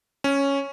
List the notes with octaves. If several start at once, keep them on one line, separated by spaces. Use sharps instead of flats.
C#4